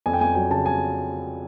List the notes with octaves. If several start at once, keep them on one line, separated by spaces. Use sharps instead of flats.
F2 G#5
G5
F2 G#5
F#3 G#5
C#3 A5
G#5